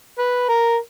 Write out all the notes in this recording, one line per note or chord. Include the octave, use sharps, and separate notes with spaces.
B4
A#4